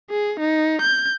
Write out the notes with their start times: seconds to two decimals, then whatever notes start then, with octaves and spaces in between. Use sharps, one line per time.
0.10 G#4
0.40 D#4
0.81 G6